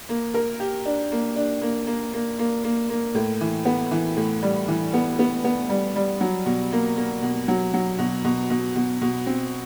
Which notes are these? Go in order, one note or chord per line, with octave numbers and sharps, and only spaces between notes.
A#3
A#4
G4
D4
A#3
D4
A#3
A#3
A#3
A#3
A#3
A#3
A2
E3
B3
E3
A2
G3
E3
B3
B3
B3
G3
G3
F#3
B2
A#3
A#3
B2
F#3
F#3
B2
B2
B2
B2
B2
C4